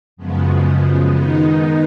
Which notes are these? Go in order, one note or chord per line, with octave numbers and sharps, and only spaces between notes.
F#2 C#3 F3 G#3 B3
D#3 G#3 B3 D#4